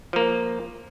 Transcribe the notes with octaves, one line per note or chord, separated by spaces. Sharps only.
F3 A#3